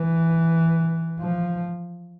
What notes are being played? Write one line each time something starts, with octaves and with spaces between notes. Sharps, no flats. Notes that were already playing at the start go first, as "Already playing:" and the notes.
Already playing: E3
F3